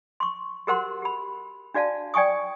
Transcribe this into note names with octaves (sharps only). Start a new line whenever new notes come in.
C6 C#6
F#4 G4 A#4 C5 F#5 C6
G4 B5
D4 F#4 D5 F5 A5
D5 G5 G#5 C#6 D#6